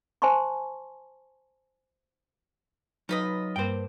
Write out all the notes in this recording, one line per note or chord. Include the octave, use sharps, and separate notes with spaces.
C5 G#5 A5 C6 C#6
F#3 D#4 F4 B4 D#5
G2 A#3 C5 G5